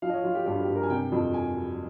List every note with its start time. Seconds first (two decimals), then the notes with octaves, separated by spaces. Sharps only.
0.02 F3 F5
0.10 D#5
0.13 C#5
0.24 F3 F4
0.35 G4
0.46 G2 G4
0.61 G4
0.68 G2
0.76 A#4
0.83 G#5
0.89 C3 G5
1.12 F2
1.34 G#5